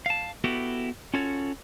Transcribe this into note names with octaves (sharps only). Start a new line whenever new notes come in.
F5 A5
B3 E4 F#4 G4 A4 B4
C#4 F4 F#4 A4 C#5